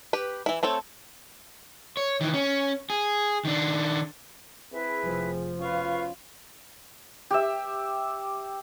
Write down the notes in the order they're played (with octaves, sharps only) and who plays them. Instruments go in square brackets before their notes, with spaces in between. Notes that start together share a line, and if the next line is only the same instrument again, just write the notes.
[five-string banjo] G4 B4
E3 E4
A3 C4 A4 C#5
[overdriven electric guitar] C#5
D#3 E3
C#4
G#4
D#3 D4
[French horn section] C4 G#4 [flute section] E4 B4 E5
[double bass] F1 F3
[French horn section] B2 C#4 F4 [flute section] B4 F5 C#6
[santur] G4 E5